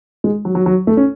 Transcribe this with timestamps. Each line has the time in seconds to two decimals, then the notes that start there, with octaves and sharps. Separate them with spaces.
0.24 G#3
0.45 F#3
0.55 F#3
0.66 F#3
0.87 A3
0.97 C#4